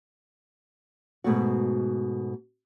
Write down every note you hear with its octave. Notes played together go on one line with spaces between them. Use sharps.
G#2 B2 A3 F#4